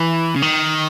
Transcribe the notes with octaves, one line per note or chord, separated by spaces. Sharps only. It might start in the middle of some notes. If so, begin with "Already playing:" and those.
Already playing: E3
C#3
D#3